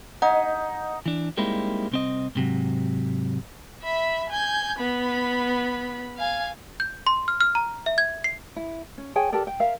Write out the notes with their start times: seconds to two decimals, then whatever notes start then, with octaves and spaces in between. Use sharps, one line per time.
0.22 D#4 D#5 F#5
1.06 E3 D4
1.37 G3 G#3 A#3 C4 D#4 E4
1.92 C2 C4 D#5
2.35 G#2 C3 F#3
3.83 E5 B5
4.29 G#5 G6
4.79 B3 B5
6.17 F5 G#5
6.80 G6
7.07 C6
7.28 F6
7.41 F6
7.55 A#5
7.86 E5
7.98 G#6
8.24 C7
8.56 E4
8.98 C#4
9.16 G#4 C#5 G5 G#5
9.32 G4 A4 A#4 D5
9.47 G5
9.60 A#4 E5 F5